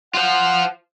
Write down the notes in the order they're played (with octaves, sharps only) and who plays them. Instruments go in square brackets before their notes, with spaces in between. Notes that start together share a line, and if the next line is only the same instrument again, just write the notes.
[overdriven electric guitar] F4 C5 [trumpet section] F#5